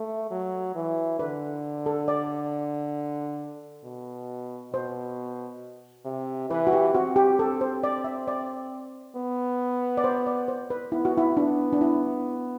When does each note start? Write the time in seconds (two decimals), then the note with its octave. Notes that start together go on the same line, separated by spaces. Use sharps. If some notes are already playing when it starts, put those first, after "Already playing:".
Already playing: A3
0.31 F#3
0.75 E3
1.19 D3 B4
1.86 A4
2.08 D5
3.84 B2
4.73 B2 C5
6.05 C3
6.50 E3 B4
6.67 F#4
6.73 G4
6.94 C4 F#4
7.16 G4
7.39 A4
7.61 C5
7.83 D5
8.04 E5
8.28 D5
9.16 B3
9.97 D5
10.04 C5
10.27 D5
10.48 C5
10.70 B4
10.92 B3 E4
11.05 F#4
11.18 E4
11.37 B3 D4
11.73 D4
11.81 E4